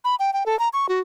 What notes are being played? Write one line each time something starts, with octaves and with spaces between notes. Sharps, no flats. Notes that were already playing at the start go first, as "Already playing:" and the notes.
B5
G5
G5
A4
A#5
C#6
F#4